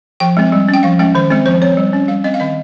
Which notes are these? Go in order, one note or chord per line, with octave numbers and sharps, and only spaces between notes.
F3 G5
G#3 C4
G3
C#4
G5
F3 F5
G#3 C#4 G5
D#3 C5
G#3 C4 C5
F3 C5
C4 C#5
G3
C#4
G3 F5
C4 D#5
F5
D#3 D#5